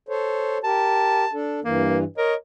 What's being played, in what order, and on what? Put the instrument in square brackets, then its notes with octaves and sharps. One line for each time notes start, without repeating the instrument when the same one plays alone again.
[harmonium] A4 C5 C#5
[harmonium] G4 A#4 [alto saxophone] A5
[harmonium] D4 A4
[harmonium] G2 E3 [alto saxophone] A#3
[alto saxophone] A#4 [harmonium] C#5 D#5